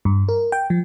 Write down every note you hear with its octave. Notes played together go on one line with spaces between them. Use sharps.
G2
A#4
G5
F3